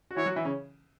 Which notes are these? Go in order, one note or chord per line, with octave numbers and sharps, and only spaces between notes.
F#4
E3 E4 C#5
F#3 F#4
E3 E4
C#3 C#4